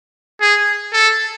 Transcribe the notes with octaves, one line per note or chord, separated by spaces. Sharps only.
G#4
A4